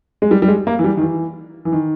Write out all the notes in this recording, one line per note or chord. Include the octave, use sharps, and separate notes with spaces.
G#3
G3
G3
G#3
A#3
E3
G3
D#3
E3
E3
D#3